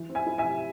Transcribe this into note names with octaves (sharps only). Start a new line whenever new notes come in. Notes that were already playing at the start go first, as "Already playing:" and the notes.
Already playing: E3
C4
E5 G#5
E4
E5 G#5
C3